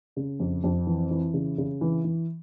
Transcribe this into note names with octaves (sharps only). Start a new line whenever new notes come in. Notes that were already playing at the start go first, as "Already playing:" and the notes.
C#3
F2
F2
E3
E3
C#3
C#3
E3
E3